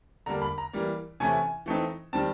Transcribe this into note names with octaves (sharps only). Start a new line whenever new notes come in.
D3 G3 A#3 A#5
B5
A#5
E3 G3 A#3
C3 E3 A3 C#4 E4 G#5
E3 A3 C4 D#4
D#3 G3 C4 A5